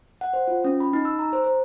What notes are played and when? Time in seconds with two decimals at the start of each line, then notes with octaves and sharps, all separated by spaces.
0.21 F#5
0.33 C5
0.48 F4
0.64 C#4
0.80 B5
0.93 D#4
1.05 E6
1.19 A#5
1.33 C5
1.44 C5